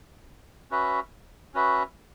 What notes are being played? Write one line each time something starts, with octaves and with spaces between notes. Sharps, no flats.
C#4 F#4 B4 E5
C#4 F#4 B4 E5